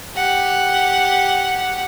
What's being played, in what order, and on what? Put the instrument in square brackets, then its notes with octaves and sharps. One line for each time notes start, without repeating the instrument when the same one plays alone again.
[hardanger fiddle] G4 F#5